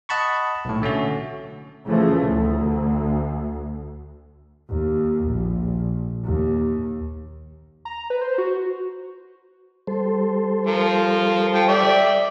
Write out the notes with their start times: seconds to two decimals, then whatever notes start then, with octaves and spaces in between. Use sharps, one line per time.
0.09 D#5 F#5 A5 B5 C#6
0.65 B1 A2
0.82 D3 A3 C#4 F#4
1.86 C#3 E3 F3 A3
2.26 D2
4.70 D#2
5.29 A#1
6.25 D#2
7.85 A#5
8.10 B4
8.21 C5
8.38 F#4
9.87 G3 A4 C5
10.67 F3 A#4
11.54 F3 G5
11.68 D5 E5 G5